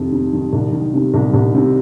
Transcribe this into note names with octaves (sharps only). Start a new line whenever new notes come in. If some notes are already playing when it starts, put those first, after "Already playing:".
Already playing: F2 C3 D#3
C3
D#3
C2
D#3
C3
C2
C2
C3